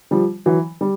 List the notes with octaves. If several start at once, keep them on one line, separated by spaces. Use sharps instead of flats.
F3 G3
E3 F#3
G3